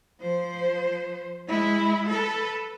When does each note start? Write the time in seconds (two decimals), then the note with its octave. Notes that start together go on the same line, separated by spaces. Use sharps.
0.20 F3 C5
1.48 G#3 E4
2.09 A4 B4